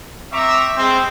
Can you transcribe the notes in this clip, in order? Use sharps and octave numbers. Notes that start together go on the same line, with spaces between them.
C4 E5 A#5 C#6 D6
G3 G#3 C4